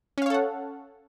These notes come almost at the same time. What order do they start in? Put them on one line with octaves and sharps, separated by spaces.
C#4 F5 C#5 A4 F#5